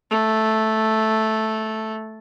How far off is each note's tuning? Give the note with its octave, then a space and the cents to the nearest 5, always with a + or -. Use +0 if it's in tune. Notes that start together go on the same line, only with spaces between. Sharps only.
A3 -5